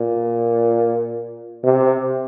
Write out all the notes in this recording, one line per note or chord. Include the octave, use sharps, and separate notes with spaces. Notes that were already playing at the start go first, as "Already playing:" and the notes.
Already playing: A#2
C3